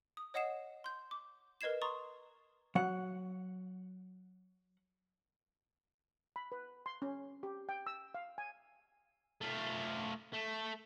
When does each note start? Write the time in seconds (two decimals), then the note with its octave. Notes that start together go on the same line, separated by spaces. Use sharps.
0.17 D#6
0.34 C#5 D#5 F#5 D#6 C7 E7
0.84 C6 G6
1.11 D6
1.61 A#4 B4 D#5 G#6 C7 E7
1.82 A#5 C6 C#6 D#6 A6
2.75 F#3 F#5
6.36 B5
6.52 B4
6.86 C6
7.02 C#4
7.43 G4
7.69 G5
7.87 E6
8.14 F5
8.38 G#5
9.41 A3 F4
10.33 A3